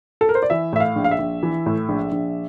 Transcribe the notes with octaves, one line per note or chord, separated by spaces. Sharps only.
A4
A#4
C5
D5
E3 E5
A2 E5
F5
A#1
F5
E5
A#1
E3
A2
A#1
A#1